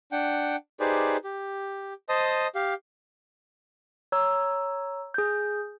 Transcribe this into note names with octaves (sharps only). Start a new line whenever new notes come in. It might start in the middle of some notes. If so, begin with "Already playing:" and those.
D4 F#5 G5
D#4 G4 G#4 B4 C5 D5
G4
C5 D#5 A5 D#6
G4 F5
C#5 A#5 E6
G#4 G6